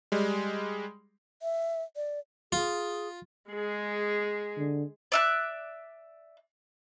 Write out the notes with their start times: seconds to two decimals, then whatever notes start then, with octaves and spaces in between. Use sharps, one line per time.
0.12 G3 G#3
1.42 E5
1.96 D5
2.52 F4 G#4
3.50 G#3 G#4
4.57 D3
5.12 D5 E5 F#6